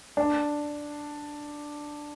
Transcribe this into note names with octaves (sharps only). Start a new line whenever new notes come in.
D4